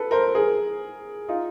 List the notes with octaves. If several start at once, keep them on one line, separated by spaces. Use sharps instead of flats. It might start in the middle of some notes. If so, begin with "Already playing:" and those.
Already playing: A4 B4
A#4 C5
G#4 A#4
D#4 F4